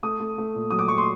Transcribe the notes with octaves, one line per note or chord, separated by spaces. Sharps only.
A3 D#6
A3
A3
A#2
F#3 D#6
D6
F#3 C#6
C6